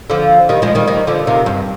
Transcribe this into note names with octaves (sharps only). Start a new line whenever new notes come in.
D3 F3
D#3 G3
F3 G#3
D#3 G3
D#3 G3
D3 F3
C3 D#3
G2